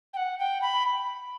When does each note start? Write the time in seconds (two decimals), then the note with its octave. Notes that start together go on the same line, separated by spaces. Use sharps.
0.13 G5
0.17 F#5
0.39 G5
0.62 B5